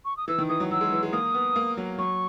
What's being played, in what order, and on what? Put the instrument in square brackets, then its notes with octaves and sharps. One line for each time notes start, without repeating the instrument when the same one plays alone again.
[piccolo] C#6
D#6
[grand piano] E3 [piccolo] E6
[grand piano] D#3
[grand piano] E3 [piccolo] D#6
[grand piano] F#3
[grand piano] F#3 [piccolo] E6
[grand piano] G#3
E3
G#3
[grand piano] A#3 [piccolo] D#6
[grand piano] B3
A#3
F#3
[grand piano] F#3 [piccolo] C#6